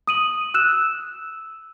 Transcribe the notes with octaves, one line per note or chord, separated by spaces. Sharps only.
D#6 D#7 F#7
E6 F#6 E7